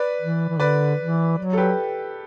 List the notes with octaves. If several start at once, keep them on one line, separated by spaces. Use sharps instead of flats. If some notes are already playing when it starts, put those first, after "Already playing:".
Already playing: B4 D5
E3
E3
D3 B4 D5
E3
F#3
A4
G4 B4